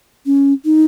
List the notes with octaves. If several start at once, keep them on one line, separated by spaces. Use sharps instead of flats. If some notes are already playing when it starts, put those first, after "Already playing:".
C#4
D#4